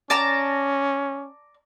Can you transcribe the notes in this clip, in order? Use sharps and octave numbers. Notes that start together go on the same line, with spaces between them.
C#4 D5 A5 A#5